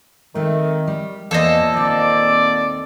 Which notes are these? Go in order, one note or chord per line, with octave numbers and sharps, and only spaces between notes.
D#3 A3 C4
G3
E2 A#2 A#3 A4 C5 D#5
D#2 C4 D5